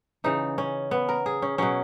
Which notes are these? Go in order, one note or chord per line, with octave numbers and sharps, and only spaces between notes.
C#3 E3 D#4
C#4
B3
A#4
G#4
C#4
B2 F#3 C#4